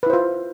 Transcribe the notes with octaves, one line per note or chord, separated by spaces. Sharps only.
E4 F4 B4 C5